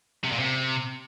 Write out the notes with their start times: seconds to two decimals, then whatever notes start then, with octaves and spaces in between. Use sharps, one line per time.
0.24 C3
0.32 A#2
0.39 C3